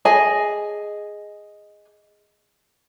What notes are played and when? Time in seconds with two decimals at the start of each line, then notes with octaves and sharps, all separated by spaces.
0.05 G#4 D#5 G#5